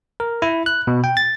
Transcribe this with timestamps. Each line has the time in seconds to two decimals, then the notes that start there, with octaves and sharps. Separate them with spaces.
0.20 A#4
0.42 E4
0.66 F#6
0.87 B2
1.04 G5
1.17 A6